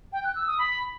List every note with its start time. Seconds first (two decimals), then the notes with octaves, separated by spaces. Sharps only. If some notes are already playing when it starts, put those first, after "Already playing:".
0.12 G5
0.24 F#6
0.35 E6
0.47 D#6
0.58 B5